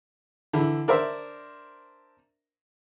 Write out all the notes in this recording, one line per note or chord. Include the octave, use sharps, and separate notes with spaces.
D3 E3 E4
D4 A#4 C5 E5